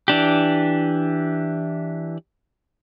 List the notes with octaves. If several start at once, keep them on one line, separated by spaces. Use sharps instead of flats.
E3 D4 G4